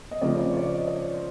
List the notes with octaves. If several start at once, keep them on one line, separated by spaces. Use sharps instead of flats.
D#5
C#3 F3 A3 C4 D5
D5
C#5
D5
D#5
D5
C#5
C5